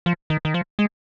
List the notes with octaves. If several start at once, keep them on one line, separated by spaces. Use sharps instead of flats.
F3
D#3
D#3
F3
G#3